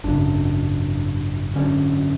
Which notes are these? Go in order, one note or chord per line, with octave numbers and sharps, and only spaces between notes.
G#1 F#2 C#3 D4
G#1 F#2 D3 C#4